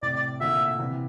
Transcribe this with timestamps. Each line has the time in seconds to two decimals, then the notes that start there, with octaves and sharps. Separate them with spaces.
0.02 A2 C3 D5
0.15 D5
0.41 A#2 D3 E5
0.79 C3 E3